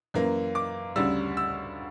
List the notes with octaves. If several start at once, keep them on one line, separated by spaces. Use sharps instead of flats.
F#2 E3 A#3
D6
D2 C#3 G3 E6
E6